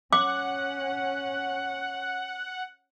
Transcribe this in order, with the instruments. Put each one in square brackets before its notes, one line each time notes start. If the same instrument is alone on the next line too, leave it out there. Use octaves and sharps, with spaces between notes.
[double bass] C#4 [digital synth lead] F#5 [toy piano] D6